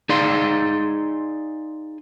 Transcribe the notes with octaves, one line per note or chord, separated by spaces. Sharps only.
D#4 G#4 D5 F5 C6